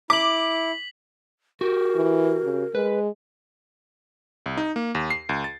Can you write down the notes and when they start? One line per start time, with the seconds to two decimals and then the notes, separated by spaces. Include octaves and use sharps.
0.10 E4 D6 B6 F#7
1.61 F#4 G4 A#4
1.95 E3
2.44 C#3
2.75 G#3 B4
4.46 C2
4.57 D#4
4.76 A#3
4.95 D#2
5.10 C7
5.29 C#2
5.44 A6